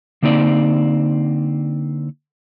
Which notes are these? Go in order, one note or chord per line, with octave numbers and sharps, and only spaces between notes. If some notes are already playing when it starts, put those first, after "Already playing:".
D3 A#3 C4 D#4 D5